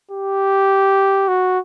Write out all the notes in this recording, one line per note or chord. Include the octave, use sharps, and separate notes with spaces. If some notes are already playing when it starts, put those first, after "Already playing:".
G4
F#4